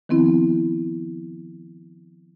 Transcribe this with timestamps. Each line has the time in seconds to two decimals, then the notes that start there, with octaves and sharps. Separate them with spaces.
0.09 D#3 F3 B3 C4 E4